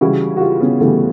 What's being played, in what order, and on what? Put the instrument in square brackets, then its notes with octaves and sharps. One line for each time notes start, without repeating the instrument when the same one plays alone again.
[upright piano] C#3 E3 G3 E4 F#4
F#4
F4 G4
B3 C#4
C#3 E3 G3 A3 B3